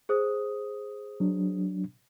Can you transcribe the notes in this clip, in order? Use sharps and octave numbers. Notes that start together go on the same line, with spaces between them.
G#4 C5 D#6
F#3 D4